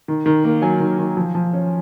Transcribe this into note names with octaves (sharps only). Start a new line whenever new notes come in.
D#3
D#3
A#3
F#3 G#5
D#3
D#3
F3
F3
C#4